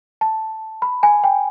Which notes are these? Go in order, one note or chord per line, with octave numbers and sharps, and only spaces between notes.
A5
B5
G#5
G5